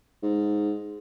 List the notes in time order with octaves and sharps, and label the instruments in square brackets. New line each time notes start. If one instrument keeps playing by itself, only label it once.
[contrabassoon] G#2